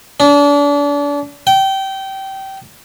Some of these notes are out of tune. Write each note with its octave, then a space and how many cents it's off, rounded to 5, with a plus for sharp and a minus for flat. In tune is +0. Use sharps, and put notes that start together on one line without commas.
D4 -35
G5 -20